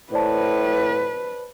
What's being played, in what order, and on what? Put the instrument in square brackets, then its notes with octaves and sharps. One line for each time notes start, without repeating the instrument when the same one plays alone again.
[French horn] A2 [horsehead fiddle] B4 [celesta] C5 D5 A5